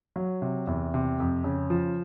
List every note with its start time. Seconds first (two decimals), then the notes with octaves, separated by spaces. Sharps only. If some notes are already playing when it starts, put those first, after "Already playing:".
0.16 F#3
0.42 C3
0.67 E2
0.94 C3
1.20 F2
1.44 C#3
1.70 F3